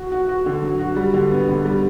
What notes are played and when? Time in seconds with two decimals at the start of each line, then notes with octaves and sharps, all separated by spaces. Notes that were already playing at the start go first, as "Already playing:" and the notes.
Already playing: F#4
0.12 F#4
0.29 F#4
0.46 D3
0.63 F#3
0.79 F#4
0.96 G3
1.14 D3
1.31 B3
1.49 D3
1.65 G3